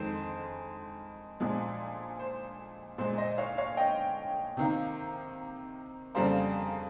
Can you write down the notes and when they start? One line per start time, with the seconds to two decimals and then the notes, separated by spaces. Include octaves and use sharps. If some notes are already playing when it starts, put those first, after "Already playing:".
Already playing: F2 D#3 G#3 C5
1.40 A#2 F3 G#3
2.19 C5
2.98 A#2 G#3 C5
3.18 C5 D#5
3.38 C#5 F5
3.58 C#5 F5
3.77 D#5 G5
4.57 C3 D#3 A#3
6.15 F2 C#3 G3 A#3 C5